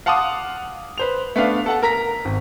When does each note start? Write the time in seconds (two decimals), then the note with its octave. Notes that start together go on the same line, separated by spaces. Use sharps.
0.06 F5 F#5 A5 C6 D6 D#6
0.98 B4 C5 F7
1.36 A3 B3 D4 F5
1.66 A4 F#5 A5
1.83 A#4 A#5 B6
2.25 G#1